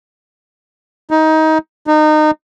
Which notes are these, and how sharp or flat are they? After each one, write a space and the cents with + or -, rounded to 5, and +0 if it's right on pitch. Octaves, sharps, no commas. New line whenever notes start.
D#4 +20
D#4 -25